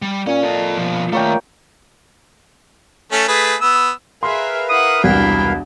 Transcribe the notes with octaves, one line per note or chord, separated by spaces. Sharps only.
G3
A#2 C#4
A4 D#5
B2 F3
D#3 A3 A#3 C#5 G5
A3 C#4 A4
A3 G#4 B4
B3 E6
G#4 A#4 B4 E5 F5 C6
E4 F#5 D#6
E1 C2 D4 E4 G5